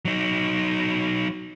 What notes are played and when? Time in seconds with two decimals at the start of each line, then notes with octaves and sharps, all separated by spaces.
0.05 F#3 D#4